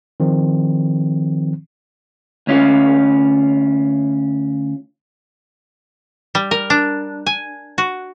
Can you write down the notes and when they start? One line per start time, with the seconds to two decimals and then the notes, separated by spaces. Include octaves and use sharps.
0.20 D#3 F3 C4
2.47 D2 C#4 F4
6.35 G3
6.51 A#4
6.70 D4
7.26 G#5
7.78 F#4